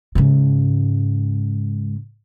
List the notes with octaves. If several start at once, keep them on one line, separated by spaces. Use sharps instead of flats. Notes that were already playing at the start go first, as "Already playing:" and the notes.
G#2 C#3